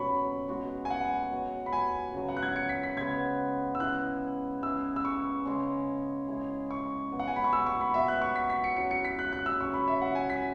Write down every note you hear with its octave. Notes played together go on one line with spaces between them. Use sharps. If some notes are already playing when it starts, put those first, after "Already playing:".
Already playing: B2 F#3 C#4 B5 C#6
G#3 B3 F#4
G#5
F#5
F#3 B3 F#4
B5
G#5
C#3 F#3 B3
F#5
F#6
G#6
C#7
B6
B6
C#3 G#3 B3 G#6
E6
E3 C#4 E4 G#4 F#6
E3 C#4 E4 G#4 E6
E6
C#6
C#3 G#3 C#4
G#3 E4 G#4
C#6
B2 F#3 B3
F#5
G#5
B5
C#6
E6
C#6
B5
B2 B3 F#4 E5
F#6
C#6
B6
B6
C#7
F#3 C#4 E4 C#7
C#7
B6
F#6
F#6
E6
C#3 F#3 C#4 G#4 C#6
B5
E5
F#5
G#5
B6